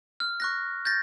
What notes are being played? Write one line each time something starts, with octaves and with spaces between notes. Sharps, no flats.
F6
C#6 F#6 A#6
G6 A6 A#6